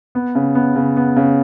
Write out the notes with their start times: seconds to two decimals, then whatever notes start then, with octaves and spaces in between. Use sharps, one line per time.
0.15 B3
0.35 C#3
0.55 B3
0.76 C#3
0.97 B3
1.16 C#3